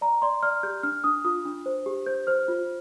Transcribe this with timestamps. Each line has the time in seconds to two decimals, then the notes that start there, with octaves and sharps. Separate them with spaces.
0.01 D5 A#5
0.22 D5 C6
0.43 D5 F6
0.63 G4 G6
0.83 D4 F6
1.04 D4 D#6
1.24 F4 D#6
1.45 D4
1.66 C5
1.86 G4
2.06 C5 G6
2.27 C5 F6
2.48 F4